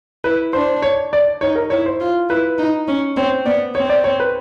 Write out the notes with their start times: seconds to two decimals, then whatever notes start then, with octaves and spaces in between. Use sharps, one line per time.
0.24 E4 B4
0.53 D4 C5
0.82 C#5
1.13 D5
1.41 D#4 C#5
1.56 A#4
1.70 E4 C#5
1.86 C5
2.00 F4
2.29 E4 B4
2.58 D#4
2.88 C#4
3.16 C4 C#5
3.46 B3 D5
3.75 C4 C#5
3.90 D5
4.04 C#5
4.20 B4